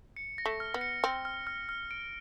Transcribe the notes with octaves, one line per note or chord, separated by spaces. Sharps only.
C#7
A#6
A3
F6
B3
C#7
C4 F6
F6
F6
F6
D7